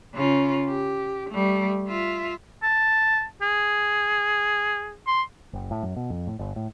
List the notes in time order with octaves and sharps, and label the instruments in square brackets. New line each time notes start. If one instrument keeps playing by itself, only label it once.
[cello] C#3 F4
G4
G3 A3
F4 E5
[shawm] A5
G#4
C6
[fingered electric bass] F#1
A2
F#2
B2
F2
A2
G1
A2